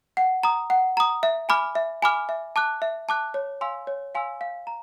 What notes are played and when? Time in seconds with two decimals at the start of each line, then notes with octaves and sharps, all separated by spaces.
0.17 F#5
0.43 A#5 D#6
0.70 F#5
0.97 A#5 D#6
1.23 E5
1.49 G#5 B5 D6 F6
1.75 E5
2.02 G#5 B5 D6 F6
2.29 E5
2.56 A5 D6 F#6
2.82 E5
3.09 A5 D6 F#6
3.34 C#5
3.61 F5 G#5 C6 E6
3.87 C#5
4.15 F5 G#5 C6 E6
4.41 F5
4.67 A#5